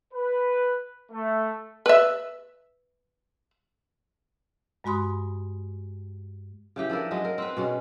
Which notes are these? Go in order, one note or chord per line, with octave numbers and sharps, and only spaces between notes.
B4
A3
B4 E5
G2 G#3 F#4 B5 C6 D#6
C#3 E3 G4
F3 D4 E4 A#4
F#3 G#3 D#4 D#5
A#4
C4 B4
B2 G#3 C#4